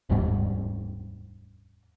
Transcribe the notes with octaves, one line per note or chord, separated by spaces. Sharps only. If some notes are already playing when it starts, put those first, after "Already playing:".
F1 D#2 G#2 G3